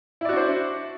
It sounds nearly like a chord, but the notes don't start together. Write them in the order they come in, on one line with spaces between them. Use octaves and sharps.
E4 D5 F#4 D4 C5